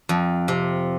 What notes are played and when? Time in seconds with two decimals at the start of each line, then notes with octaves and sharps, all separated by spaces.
0.09 F2
0.48 C3